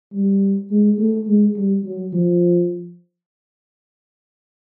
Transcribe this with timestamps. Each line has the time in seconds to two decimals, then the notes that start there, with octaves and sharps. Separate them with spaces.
0.13 G3
0.71 G#3
0.99 A3
1.28 G#3
1.56 G3
1.84 F#3
2.13 F3